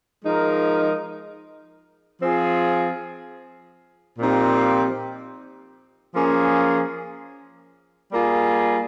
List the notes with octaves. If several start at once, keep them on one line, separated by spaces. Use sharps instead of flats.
F3 G#3 D#4 A#4
F3 C4 F4 G#4
A#2 F3 C4 D#4 G4
F3 A#3 C#4 G#4
G3 A#3 F4 G#4